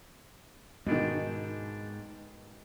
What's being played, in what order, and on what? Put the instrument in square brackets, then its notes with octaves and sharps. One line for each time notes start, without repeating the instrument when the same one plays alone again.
[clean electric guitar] G#2 D4 [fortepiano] B2 D#3 [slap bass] G#3